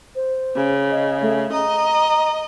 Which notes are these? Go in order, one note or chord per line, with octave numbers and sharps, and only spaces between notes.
C5
C#3
D#5
A3
D#5 A#5